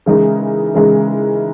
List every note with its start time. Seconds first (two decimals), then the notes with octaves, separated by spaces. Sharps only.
0.06 C#3 E3 G#3 D#4 A#4
0.75 C#3 E3 G#3 D#4 A#4